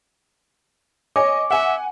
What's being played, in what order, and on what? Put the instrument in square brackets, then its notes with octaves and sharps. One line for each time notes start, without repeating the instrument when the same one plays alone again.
[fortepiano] C#5 [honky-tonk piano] D#5 G#5 [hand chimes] D6
[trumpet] E5 [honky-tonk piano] F#5 G#5